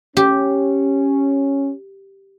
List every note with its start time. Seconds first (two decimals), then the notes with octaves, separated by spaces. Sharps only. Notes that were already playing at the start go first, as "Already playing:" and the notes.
0.17 C#4 G4